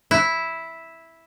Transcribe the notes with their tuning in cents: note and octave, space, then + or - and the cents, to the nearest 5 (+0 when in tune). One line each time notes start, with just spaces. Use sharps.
E4 -5